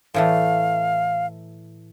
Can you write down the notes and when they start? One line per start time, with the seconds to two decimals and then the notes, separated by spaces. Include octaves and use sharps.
0.14 A2 E3 A3 F5